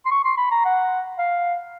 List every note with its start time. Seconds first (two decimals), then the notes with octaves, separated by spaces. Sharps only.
0.05 C6
0.11 C#6
0.24 C6
0.38 B5
0.51 A#5
0.65 F#5
1.18 F5